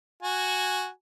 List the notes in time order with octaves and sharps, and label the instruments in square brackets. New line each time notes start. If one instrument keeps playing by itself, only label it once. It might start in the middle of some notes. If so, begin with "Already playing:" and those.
[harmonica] F#4 G#5